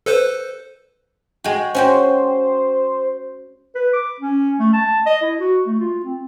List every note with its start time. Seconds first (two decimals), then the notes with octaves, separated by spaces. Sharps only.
0.06 A4 B4 C5
1.44 G#3 F#4 G5
1.75 C#4 F#4 C5 G5
3.75 B4
3.93 D6
4.20 C#4
4.59 A3
4.73 A5
5.06 D#5
5.22 E4
5.39 F#4
5.67 A3
5.80 F4
6.04 C4